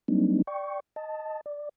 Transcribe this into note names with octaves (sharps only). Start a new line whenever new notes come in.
F#3 G3 A#3 C4 D4 D#4
D5 G5 C#6
D#5 A5
D5